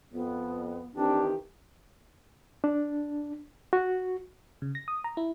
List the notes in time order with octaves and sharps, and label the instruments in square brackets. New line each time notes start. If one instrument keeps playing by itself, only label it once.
[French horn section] F2 [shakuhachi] B3
[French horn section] D#3 E3 G4 [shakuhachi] C4 [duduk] D4
[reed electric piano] D4
F#4
[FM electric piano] C#3
A#6
D#6
A#5
E4